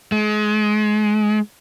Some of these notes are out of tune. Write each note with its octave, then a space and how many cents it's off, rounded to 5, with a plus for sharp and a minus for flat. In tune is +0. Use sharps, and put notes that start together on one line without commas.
G#3 +30